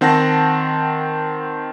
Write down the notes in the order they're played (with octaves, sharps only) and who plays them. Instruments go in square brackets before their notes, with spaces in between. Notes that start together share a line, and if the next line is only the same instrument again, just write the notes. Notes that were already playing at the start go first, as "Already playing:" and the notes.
[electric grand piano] D#3 C4 F#5 A5 A#6